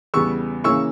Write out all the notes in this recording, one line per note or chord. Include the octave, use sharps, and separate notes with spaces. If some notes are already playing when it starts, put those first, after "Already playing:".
E2 C#3 G3 B3 C#6 E6
C#3 E3 A#3 C#4 C#6 E6